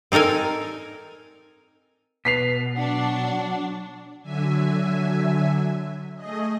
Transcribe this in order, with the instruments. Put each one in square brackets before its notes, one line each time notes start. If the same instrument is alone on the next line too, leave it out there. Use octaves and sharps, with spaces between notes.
[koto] C4 D#4 A4 A#4 G#5
[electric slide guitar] B2 [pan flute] B4 [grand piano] B6 C7 F7
[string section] F#3 D4 [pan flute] F#5
[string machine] D3 F#3 E5 G#5
A3 G#4 D#5